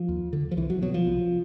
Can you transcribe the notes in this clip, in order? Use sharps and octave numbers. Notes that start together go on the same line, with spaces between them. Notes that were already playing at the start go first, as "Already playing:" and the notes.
Already playing: F3
D#2
D3
F3
C2 E3
F#3
B2 F#3
F3
C2